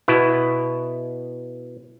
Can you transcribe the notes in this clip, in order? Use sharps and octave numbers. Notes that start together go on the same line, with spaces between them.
B2 B3 E4